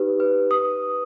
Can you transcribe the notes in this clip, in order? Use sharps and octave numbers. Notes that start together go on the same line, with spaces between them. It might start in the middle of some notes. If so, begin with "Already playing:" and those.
Already playing: D#4 G4 B4
B4
B4 D#6